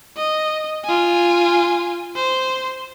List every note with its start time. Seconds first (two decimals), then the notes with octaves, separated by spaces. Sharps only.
0.17 D#5
0.84 F4 G#5
2.16 C5